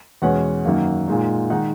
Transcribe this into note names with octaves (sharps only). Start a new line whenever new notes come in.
E2 B2 G#3 C#4 F#5
F#2 D#3 A#3
A#2 G#3 D#4
D#3 G#3 D#4 F#5